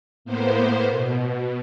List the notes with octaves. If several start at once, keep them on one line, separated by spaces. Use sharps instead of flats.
A2 A#3 B3 C5
B2